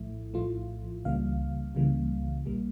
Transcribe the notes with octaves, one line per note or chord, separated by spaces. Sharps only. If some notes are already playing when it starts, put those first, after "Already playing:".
Already playing: A#1 A2 F3 A3 E4
A#1 A2 F3 A3 F4
C#2 C#3 E3 G3 A#3 F5
C#2 C#3 E3 G3 A#3
A#1 A#2 G3 A#3